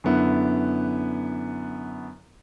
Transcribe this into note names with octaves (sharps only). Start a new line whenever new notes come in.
F#2 D3 B3 E4